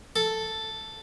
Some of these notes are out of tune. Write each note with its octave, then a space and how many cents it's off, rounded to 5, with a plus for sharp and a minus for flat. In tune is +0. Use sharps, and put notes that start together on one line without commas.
A4 +0